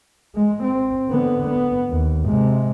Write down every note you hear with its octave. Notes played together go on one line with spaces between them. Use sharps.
G#3
C4
D3 B3
B3
D#2
C3 G#3